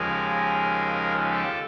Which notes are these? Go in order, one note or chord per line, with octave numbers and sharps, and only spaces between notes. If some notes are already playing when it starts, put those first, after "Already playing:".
Already playing: D#2 C#3 F3 G#3 G#4 A#4
G4 A4